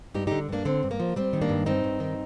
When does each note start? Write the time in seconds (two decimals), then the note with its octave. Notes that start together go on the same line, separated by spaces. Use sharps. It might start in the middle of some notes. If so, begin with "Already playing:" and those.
0.14 G2 D#4 G4
0.27 D3 D#4 G4
0.49 G2 A#3 D4
0.65 D3 C4
0.83 G2
0.91 A#3
1.00 F3
1.16 G3 C4
1.33 D#3
1.41 A#3 D4
1.49 G2
1.66 G2 C4 D#4
1.84 G2
2.00 D#3